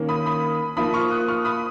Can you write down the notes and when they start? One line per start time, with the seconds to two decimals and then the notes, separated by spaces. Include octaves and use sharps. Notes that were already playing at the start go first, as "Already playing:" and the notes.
Already playing: D#3 A#3 C#4
0.09 B5 D#6
0.26 B5 D#6
0.77 F3 A#3 D#4 B5 D#6
0.94 C#6 F6
1.11 D#6 F#6
1.28 C#6 F6
1.45 B5 D#6